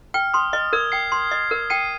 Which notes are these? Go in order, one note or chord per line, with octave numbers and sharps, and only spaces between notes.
G5 F6
C6 D#6
D#5 F6
A#4 G#6
G5 C7
C6
D#5
A#4
G5 C7 D#7